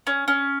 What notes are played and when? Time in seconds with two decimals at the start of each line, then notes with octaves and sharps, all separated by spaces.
0.07 C#4
0.28 C#4